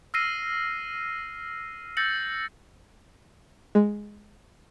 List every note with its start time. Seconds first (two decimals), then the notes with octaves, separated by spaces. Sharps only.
0.14 E6 F6 A#6 C7 D#7
1.97 E6 G6 A6 A#6 C#7 F#7
3.75 G#3